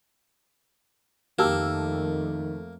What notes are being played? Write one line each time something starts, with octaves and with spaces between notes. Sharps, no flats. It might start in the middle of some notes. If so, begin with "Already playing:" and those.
F2 D#3 A3 A#3 G4 A5 E6